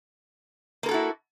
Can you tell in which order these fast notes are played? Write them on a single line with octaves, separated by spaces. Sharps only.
A#3 A#4 A4 F#4 E4